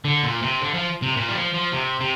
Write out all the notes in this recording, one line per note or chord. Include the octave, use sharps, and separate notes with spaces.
D3
A#2
C3
D3
F3
C3
A#2
G3
F3
F3
C3
C3